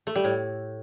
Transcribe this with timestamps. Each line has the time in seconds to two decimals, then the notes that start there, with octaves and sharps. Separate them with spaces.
0.07 A3
0.15 G3
0.24 A2